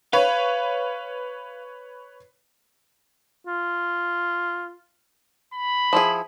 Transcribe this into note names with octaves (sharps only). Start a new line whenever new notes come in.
B4 C#5 F5
F4
B5
F3 E4 G#4